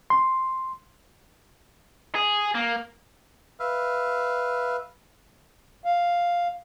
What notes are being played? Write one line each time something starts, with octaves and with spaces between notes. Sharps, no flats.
C6
G#4
A#3
B4 E5 F5
F5